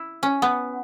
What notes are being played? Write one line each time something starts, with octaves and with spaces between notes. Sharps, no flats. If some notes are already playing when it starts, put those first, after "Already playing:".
Already playing: E4
C#4
B3